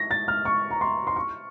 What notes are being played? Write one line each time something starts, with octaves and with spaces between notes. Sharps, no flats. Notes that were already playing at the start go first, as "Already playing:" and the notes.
Already playing: A#6
A6
F6
C#6
A#5
C6
C6
C#6